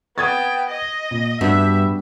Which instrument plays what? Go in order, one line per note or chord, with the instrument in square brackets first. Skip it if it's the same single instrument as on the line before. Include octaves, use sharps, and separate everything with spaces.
[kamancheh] B3 G5 [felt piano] D#6 G#6 A6
[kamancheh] D#5
[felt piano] A#2
[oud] G2 [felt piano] B3 D4 F#4 [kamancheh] E5